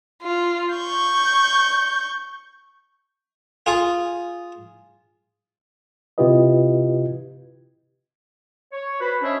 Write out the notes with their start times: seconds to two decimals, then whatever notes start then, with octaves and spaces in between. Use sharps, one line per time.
0.23 F4
0.75 C#6 G6
3.66 F4 G#4
6.18 C3 E4 F4 G4 B4 D#5
8.73 C#5
9.01 F#4 B4 C5 B5
9.22 C#4 D4 C5 C#5 D#5 E5